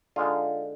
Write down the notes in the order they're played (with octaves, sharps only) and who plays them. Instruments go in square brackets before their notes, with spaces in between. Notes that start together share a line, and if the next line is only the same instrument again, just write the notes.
[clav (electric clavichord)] D3 G#3 D#4 F4